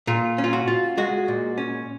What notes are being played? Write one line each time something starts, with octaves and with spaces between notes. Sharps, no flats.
A#2 F4
C#4
F4
F#4
F4
G#3 F#4
A#2
C#4